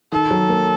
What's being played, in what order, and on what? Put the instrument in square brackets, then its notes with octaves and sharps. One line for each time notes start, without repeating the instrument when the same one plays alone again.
[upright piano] D#3 [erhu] A4
[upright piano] F#3
A#3